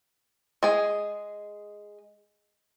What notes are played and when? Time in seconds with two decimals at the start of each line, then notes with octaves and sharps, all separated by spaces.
0.63 G#3 G#4